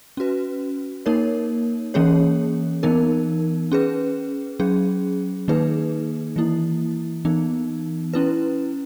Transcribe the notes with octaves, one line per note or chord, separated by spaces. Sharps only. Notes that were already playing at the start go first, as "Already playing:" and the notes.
C#4 F#4 B4
A#3 D#4 A#4 C#5
E3 A#3 C#4 G#4 C#5
E3 B3 D#4 A#4
C#4 G#4 B4
F#3 C#4 G#4
D#3 A#3 D#4 G#4 B4
E3 A#3 E4
E3 B3 D#4
C#4 E4 B4